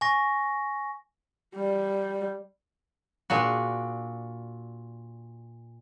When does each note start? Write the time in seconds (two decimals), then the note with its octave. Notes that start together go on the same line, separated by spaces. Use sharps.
0.01 G#5 C#6 A#6
1.55 G3
3.30 A#2 D4 F#4